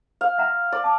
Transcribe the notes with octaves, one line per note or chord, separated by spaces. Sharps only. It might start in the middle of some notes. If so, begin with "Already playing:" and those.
F5
E5 F#5 A#5
D5
A5 D6